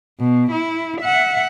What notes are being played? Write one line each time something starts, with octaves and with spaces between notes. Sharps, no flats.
B2
E4
E5 F#5